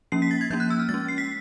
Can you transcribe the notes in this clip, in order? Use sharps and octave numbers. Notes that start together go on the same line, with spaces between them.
F3 A#3 C#4 C7
B6
A6
G#6
F3 A#3 C#4 G6
F#6
E6
F6
G#3 A6
C#4
C7
B6